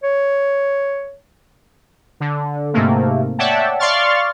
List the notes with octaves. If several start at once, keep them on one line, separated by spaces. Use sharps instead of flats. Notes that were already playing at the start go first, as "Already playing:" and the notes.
C#5
D3
G#2 C3 A3 A#3
C#5 D5 E5 F#5 G5 A5
D5 F5 C6 C#6 F6 A6